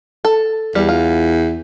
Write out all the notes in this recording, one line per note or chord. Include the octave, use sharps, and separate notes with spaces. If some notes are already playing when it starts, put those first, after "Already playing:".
A4
E2 G3
F4